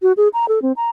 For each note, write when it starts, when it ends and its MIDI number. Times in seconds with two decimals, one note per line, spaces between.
0.02 0.13 66
0.17 0.28 68
0.33 0.48 82
0.48 0.62 69
0.62 0.72 60
0.76 0.90 82